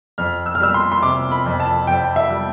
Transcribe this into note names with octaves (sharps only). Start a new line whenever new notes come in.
F2 F6
E6
F6
G3 E6
C6
C6
C3 D6
B5
F2
A5
F2 G5
E5
G3